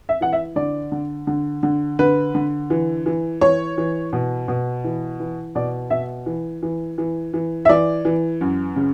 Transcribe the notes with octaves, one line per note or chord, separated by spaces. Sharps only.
E5
E3 F#5
E5
D3 D5
D3
D3
D3
D3 B4
D3
E3
E3
E3 C#5
E3
B2
B2
E3
E3
B2 D5
B2 E5
E3
E3
E3
E3
E5
E3 D5
E3
F#2
C#3